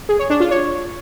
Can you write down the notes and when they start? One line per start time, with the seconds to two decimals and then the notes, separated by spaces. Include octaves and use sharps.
0.09 G#4
0.19 C#5
0.30 D4
0.40 F4
0.51 C#5